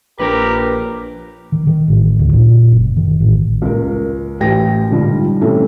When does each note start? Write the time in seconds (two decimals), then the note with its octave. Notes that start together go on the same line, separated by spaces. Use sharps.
0.20 A#1 G4 A#4 B4 C#5 A#5
1.52 D#3
1.67 D#3
1.88 A1
2.19 D2
2.33 A#2
2.72 F#1
2.97 D#3
3.20 A1
3.62 C#2 A#4
4.40 A1 G5 A#6
4.91 G#2 D3 F3 G3 F4
5.41 C3 E3 G3 A3 C4 C#4